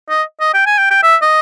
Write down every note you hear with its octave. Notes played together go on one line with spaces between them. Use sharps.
D#5
D#5
G5
G#5
G5
G5
E5
D#5